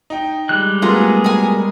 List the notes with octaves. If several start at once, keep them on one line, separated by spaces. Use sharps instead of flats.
D#4 G5
G3 G#3 F#6
F#3 A3 B3 F4 G#4 A#4
A#4 G#5